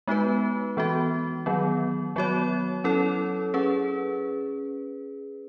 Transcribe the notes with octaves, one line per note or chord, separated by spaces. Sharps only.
G#3 B3 D#4 F#4 B4
E3 B3 F#4
D#3 F#3 B3
F#3 B3 F#4 C#5
F#3 C#4 E4 A4 C#5
C#4 G#4 B4